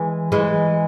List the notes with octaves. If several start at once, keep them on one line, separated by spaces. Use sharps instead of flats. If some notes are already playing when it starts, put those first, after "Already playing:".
Already playing: E3 G#3
E3 G#3